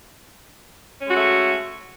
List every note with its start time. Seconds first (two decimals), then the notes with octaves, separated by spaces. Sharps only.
1.01 C#4
1.06 G#3
1.11 F#4
1.15 A3